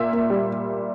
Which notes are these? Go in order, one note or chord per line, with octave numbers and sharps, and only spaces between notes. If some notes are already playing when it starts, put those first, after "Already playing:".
Already playing: A#2 A#3 E5
A#3
G3